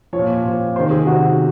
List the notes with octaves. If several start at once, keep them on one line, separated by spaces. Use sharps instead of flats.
F3 C#5
A#2
A#2 F3
C3 C5
D#3
G#4
C3 D#3 F#4